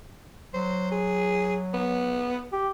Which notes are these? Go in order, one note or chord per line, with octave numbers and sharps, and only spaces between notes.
F#3 C5
G#4
B3
G4